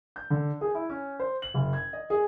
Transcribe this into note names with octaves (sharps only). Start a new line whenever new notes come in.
G6
D3
G#4
E4
C#4
C5
F#7
F#1
G#6
D#5
G#4